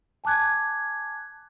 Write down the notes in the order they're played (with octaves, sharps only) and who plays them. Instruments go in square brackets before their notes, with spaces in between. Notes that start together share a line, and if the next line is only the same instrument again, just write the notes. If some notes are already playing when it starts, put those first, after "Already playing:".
[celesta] G#5 A5 D6 F#6 G#6